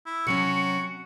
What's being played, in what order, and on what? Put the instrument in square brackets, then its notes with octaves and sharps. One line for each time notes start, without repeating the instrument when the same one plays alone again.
[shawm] E4
[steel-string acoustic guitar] C3 F#3 C#4 [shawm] F#4 [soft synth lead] C#7